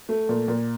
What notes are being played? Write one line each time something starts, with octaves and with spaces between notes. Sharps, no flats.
A3
A#2
A#2